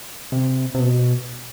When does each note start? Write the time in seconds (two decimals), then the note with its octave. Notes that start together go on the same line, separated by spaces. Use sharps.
0.32 C3
0.75 C3
0.80 B2